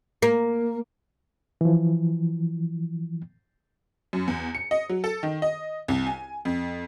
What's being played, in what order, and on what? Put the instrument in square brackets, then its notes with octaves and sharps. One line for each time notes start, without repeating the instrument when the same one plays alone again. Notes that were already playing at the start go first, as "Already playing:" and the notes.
[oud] A#3
[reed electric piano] E3 F3
[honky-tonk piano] F#2
E2
C#7
D#5
F#3
A4
D#3
D#5
C2
G#5
F2